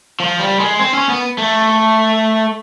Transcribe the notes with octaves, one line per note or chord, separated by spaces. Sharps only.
F3
G3
G#3
C4
C#4
B3
A3